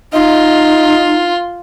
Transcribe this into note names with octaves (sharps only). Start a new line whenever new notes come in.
D#4 F4 D#5